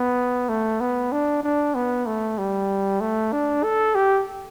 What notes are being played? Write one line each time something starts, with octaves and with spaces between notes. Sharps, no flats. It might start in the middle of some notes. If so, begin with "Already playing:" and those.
Already playing: B3
A3
B3
D4
D4
B3
A3
G3
A3
D4
A4
G4